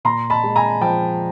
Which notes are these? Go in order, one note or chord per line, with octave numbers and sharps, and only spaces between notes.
A#2 A#5 C6
A5 B5
G#3
G#5 A#5
F3 G5 A5